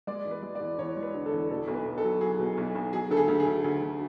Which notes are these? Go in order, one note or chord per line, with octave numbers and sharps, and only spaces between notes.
G#3 D5
E2
B4
G#3
D5
E2
E2 C#5
G#3
B4
D3
A4
E2
B2 A4
B1
B4
B1
A4
F#3
F#3 G#4
B2
B1
B1
F#3 G#4
D2 A4
G#4
D2
G#4
D2
D2
D2